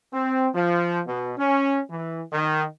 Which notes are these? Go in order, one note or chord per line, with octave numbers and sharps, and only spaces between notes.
C4
F3
B2
C#4
E3
D#3